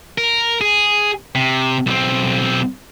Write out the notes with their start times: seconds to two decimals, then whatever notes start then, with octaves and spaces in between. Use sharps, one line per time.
0.18 A#4
0.61 G#4
1.35 C3
1.86 B1 C4